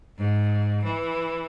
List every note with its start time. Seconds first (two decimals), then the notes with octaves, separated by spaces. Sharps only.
0.18 G#2
0.83 E3